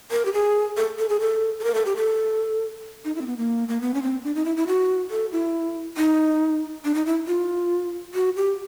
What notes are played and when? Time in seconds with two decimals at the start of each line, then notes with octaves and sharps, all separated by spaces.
0.11 A#4
0.25 G4
0.33 G#4
0.77 A4
0.99 A4
1.09 G#4
1.20 A4
1.60 A4
1.64 A#4
1.75 A4
1.85 G4
1.96 A4
3.05 D#4
3.16 E4
3.21 C4
3.26 B3
3.38 A#3
3.68 A#3
3.81 B3
3.94 C#4
4.03 C4
4.24 D4
4.35 D#4
4.45 E4
4.56 E4
4.67 F#4
5.11 A4
5.32 E4
5.97 D#4
6.85 D4
6.95 D#4
7.06 E4
7.27 F4
8.14 F#4
8.36 G4